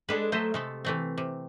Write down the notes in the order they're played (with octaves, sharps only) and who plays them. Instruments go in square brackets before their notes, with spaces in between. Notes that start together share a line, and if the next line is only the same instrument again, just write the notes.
[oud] G#3 D4 A4 [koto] B4
[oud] F#3 A3 E5 [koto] C5 D#5
[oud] C3 [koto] G#3 A3 A4
[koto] E3 A3 C4
C3